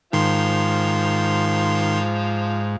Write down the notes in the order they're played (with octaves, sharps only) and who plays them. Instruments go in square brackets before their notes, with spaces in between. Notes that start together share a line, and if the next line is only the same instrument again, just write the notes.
[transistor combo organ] G#2 [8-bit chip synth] D#3 C6 [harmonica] F3 F4